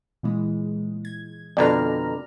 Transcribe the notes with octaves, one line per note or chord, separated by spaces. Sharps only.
A#2 E3 G#3
G#6
F2 B2 D3 D5 A#5 F6